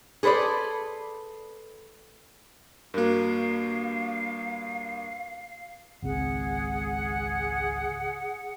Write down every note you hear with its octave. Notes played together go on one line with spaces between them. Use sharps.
G#4 A4 B4 C5 D5
G2 A#3 F#4 A#4 F5
G#1 C#2 C4 G#4 F#5